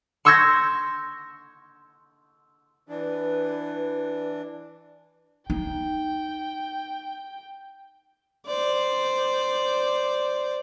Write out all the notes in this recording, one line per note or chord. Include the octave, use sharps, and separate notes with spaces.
C6 C#6 E6 G6 G#6 A#6
E3 D4 B4
D#4 G5
C5 D5